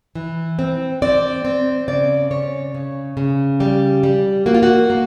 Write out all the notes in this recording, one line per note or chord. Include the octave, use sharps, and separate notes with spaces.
E3
C4
C4 D5
C4
C#3 D5
C#3 C#5
C#3
C#3
G3 G4
G3
A#3 F#4
F4
F#4
A#3